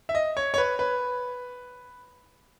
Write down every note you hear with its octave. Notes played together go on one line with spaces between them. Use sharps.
E5
D#5
C#5
C#5
B4
B4